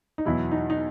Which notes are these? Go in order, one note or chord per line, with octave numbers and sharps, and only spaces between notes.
D#4
E2 B2 F#3 E4
D#4
D#4